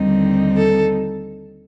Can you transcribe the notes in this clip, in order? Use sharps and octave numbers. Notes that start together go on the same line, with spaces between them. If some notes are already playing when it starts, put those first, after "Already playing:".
Already playing: D#2 D3 G3 C4 D#4
A4